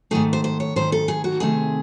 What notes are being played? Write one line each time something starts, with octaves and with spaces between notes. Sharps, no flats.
G#2 D#3 A3 G#4
C5
C5
C#5
G#2 D#3 A3 C5
A4
G#4
F#4
C3 D#3 A3 C4 G#4